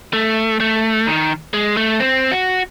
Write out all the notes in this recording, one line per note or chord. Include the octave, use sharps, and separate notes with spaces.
A3
A3
D#3
G#3
A3
C4
F#4